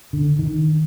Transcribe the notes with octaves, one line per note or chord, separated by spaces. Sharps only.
D3
D#3